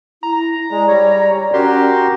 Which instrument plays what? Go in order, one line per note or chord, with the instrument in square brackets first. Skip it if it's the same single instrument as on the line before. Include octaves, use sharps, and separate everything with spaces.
[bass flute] E4 [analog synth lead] A#5
[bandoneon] G#3 [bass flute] D5
[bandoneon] G3 C#5
[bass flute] C#4 [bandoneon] F#4 A#4 C6 [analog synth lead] G4